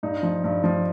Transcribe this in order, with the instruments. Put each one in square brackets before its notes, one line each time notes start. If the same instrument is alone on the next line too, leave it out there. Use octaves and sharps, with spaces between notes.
[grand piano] G2 D#4
F3
G2
F3